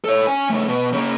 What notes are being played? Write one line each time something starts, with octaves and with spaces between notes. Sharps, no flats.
A4 C#5
C#4 G#5
C#3 A3
B2
C#3 A#3